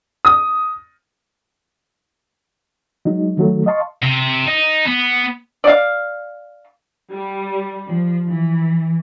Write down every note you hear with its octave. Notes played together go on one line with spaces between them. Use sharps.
D#6
F#3 G#3 D#4
D#3 F#3 A3
D#5 F5 A5 C6 C#6
C3
D#4
B3
D5 F5
G3
F3
E3